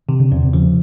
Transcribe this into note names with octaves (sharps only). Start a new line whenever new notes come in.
C3 D#3
D3
E2 C#3
C3
C#3 F3